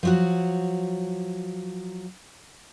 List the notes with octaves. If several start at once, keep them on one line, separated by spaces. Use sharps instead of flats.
F3 F#3 F#4